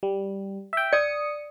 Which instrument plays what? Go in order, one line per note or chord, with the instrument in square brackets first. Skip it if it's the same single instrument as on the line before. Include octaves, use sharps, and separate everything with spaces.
[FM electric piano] G3
E5 G5
[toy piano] D5 [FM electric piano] D#6 C#7